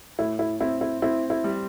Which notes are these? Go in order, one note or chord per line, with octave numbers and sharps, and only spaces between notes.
A2 E4
E4
C4 E4
E4
C4 E4
E4
G3